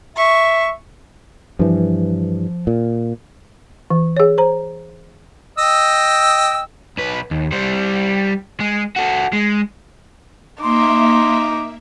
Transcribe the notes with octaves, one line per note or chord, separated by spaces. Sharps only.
E5 C#6
G2 E3 F3
A#2
E3
G#4 C#5
C5 A#5
D#5 G5 E6
B1 B4
D#2
G3 C5
G#3
F#4 A4
G#3
A#3 D#4 E5 C6 D6